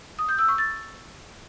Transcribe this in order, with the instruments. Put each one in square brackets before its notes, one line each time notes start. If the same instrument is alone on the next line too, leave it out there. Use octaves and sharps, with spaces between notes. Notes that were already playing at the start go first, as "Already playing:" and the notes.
[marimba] D#6
G6
E6
C#6
A6